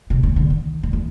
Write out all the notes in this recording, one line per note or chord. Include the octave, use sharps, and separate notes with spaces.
C3
C#3
D3
D#3
D#3
E3